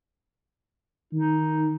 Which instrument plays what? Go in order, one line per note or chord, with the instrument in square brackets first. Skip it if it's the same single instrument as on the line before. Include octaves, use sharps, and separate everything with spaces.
[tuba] D#3 [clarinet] D#4